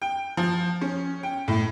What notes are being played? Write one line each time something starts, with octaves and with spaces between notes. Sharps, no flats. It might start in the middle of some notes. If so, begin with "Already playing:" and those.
G5
F3
C#4
G5
A2